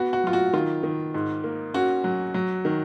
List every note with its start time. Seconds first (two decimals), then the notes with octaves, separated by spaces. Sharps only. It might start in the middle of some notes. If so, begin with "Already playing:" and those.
Already playing: B3 F#4
0.13 F#4
0.24 F#3 F4
0.33 F#4
0.53 D#3 F4
0.83 D#3
1.14 G#2
1.44 A#3
1.74 C#4 F#4
2.04 F#3
2.34 F#3
2.65 D#3